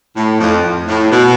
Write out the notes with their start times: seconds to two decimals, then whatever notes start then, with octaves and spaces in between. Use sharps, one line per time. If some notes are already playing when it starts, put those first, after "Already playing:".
0.16 A2
0.40 F2
0.87 A2
1.11 B2